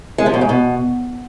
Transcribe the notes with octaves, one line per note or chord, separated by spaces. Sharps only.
G#3
F3
B2
G#2
B2